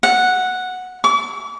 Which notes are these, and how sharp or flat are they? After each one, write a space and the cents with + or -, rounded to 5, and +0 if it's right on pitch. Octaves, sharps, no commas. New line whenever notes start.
F#5 -5
D6 -40